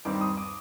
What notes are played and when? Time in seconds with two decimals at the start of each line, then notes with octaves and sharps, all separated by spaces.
0.05 G2 D#3 G3 C4 D6
0.21 D#6
0.37 D6